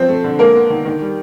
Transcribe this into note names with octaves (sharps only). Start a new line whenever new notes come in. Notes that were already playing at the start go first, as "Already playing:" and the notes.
Already playing: F3 C4 C5
A3
D3
G#3 A#3 A#4
B3
D#3
D#3
G3